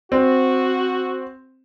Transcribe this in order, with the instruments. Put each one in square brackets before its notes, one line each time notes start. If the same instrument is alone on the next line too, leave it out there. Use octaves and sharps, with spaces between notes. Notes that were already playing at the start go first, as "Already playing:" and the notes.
[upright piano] C4 [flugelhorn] F#4